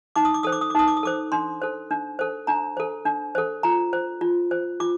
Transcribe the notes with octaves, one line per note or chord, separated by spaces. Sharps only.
D#4 D6
D#6
D6
A4 C5 D#6
D6
D#6
D6
D#4 D#6
D6
D#6
A4 C5 D6
D4 C6
A4 C5
D4
A4 C5
D4 A#5
A4 C5
D4
A4 C5
F4 A#5
C5
F4
C5
F4 D6